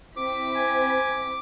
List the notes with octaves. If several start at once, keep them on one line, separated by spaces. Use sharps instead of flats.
C4 E4 D6 B6
G#5